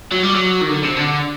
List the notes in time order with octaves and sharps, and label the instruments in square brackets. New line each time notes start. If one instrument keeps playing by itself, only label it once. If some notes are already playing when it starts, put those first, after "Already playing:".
[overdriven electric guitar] F#3
G3
F#3
D#3
D3
C3
D3